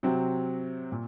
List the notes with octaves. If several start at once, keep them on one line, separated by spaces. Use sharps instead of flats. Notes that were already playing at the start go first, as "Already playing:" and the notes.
C3 F#3 C4 F#4
A#2